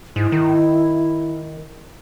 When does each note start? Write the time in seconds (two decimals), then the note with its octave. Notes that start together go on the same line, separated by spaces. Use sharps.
0.16 G#2 E4
0.32 D#3